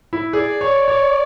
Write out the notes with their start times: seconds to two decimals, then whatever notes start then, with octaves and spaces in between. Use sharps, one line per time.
0.13 E4
0.33 G#4 D5
0.61 C#5
0.88 C#5